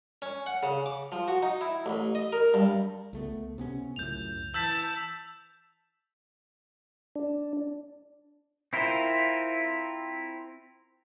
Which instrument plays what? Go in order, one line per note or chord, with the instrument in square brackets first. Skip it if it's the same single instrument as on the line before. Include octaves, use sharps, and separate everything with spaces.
[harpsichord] C#4
F#5
C#3
D6
F3
F#4
D#4
E4
A1
D#5
A#4
G2
[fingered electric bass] C#2 A3 B3
C3 B3 C#4
[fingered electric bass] C#2 F#2 A2 [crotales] G6 F7
[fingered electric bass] E3 [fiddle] A5 [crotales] E6 G6 B6
[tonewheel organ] D4
[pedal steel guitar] C4 E4 F4 A#4 C5